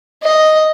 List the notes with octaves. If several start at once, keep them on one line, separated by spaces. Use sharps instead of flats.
D#5